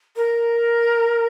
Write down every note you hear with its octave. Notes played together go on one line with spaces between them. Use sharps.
A#4